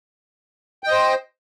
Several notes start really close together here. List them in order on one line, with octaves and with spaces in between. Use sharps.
G5 D#5 C5